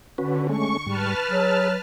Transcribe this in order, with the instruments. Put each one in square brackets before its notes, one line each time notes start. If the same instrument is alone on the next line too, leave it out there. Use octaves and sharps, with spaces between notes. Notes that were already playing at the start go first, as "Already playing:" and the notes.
[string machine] D3 [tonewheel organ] C#4 F#4 B4
[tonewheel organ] G#3 A3 C#4 [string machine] C#6
[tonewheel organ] G#2 G3 [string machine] B4 A5 F6
[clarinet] F#3 [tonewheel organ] G#4